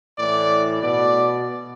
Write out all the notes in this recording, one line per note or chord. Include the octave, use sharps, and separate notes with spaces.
A2 E3 D5
B2 D5